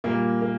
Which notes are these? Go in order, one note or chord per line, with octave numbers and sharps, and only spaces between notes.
A#2 G3 A#3
A#3